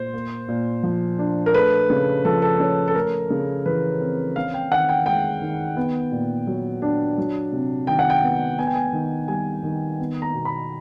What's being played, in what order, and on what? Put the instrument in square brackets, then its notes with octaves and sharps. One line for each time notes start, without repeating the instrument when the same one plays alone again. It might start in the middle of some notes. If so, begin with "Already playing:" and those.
Already playing: [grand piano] A#2 C5
A#3
A#2
F3
D4
A#4
A3 B4
C#3
F3 A4
A4
C#4
A4
A3 A#4
C#3
E3 B4
C4
C#4 F5
G5
D#3 F#5
G5
G#3 G5
D#3
B3
A#2
F#3
D4
F#3
C3
D#3 G5
F#5
G5
B3
B3 G#5
G5
G#5
D#3
G3 G#5
D#3
B3
A#5
B2
B5